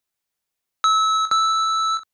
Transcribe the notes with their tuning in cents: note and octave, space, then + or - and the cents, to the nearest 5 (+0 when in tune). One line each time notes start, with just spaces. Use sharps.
E6 -25
E6 -5